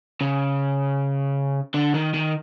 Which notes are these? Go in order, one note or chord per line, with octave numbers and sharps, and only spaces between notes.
C#3
D3
D#3
D#3